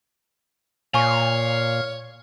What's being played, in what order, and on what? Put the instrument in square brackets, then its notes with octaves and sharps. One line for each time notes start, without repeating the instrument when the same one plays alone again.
[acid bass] A#2 [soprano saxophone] C#5 [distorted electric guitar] F5 [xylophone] G#5 C#6